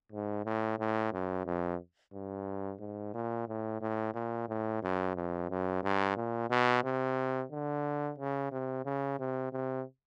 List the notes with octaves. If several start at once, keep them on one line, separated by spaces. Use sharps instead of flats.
G#2
A2
A2
F#2
F2
G2
G#2
A#2
A2
A2
A#2
A2
F#2
F2
F#2
G2
A#2
B2
C3
D3
C#3
C3
C#3
C3
C3